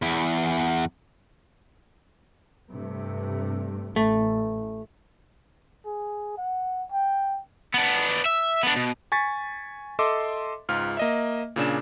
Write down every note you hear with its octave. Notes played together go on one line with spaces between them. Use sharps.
E2 E4
G2 C3 A3
A1 A3
G#4
F#5
G5
B3 D4
E5
B3 D4
B2
G#5 C#6 A6 B6
A4 D#5 E5 C6 D6
C#2 G#2 F4 F6
A#3 D#5 E5
A#2 C#3 D4 E7